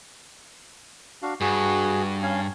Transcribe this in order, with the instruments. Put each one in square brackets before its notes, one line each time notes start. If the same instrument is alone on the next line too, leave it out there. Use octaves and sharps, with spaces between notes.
[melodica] D4 F#4 F5
[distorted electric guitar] G2 [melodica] F#4 G#4
[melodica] C#4 F5 G#5